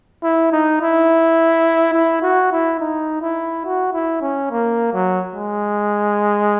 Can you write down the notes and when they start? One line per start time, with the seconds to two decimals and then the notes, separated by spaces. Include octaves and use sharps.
0.23 E4
0.52 D#4
0.81 E4
1.94 E4
2.22 F#4
2.52 E4
2.80 D#4
3.22 E4
3.65 F#4
3.93 E4
4.22 C#4
4.51 A#3
4.93 F#3
5.35 G#3